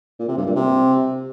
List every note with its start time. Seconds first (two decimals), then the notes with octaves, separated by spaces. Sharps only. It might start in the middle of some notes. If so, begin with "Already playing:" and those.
0.19 A#2
0.28 C3
0.37 G2
0.46 A#2
0.55 C3